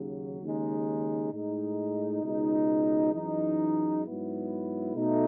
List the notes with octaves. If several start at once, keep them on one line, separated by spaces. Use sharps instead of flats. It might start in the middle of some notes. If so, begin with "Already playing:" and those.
Already playing: D#2 C#3 F#3
D#2 C#3 G#3 D#4
A2 G#3 D#4
C#2 B2 G#3 D#4
F#2 E3 G#3 D#4
G#2 F#3 B3 E4
B2 A3 D#4